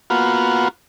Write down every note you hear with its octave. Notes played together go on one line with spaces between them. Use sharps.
A#3 B3 F4 F#4